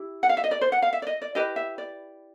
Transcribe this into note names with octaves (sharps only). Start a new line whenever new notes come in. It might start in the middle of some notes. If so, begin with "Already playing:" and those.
Already playing: E4 G4
F#5
F5
E5
D#5
D5
C5
F#5
F5
E5
D5
D#5
D5
E4 G4 B4 D#5
E5
D5